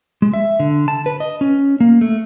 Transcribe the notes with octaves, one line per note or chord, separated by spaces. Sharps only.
G#3
E5
D3
A5
B4
D#5
C#4
A#3
A3